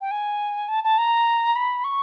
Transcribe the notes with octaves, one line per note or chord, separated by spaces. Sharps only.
G5
G#5
A5
A5
A#5
B5
C#6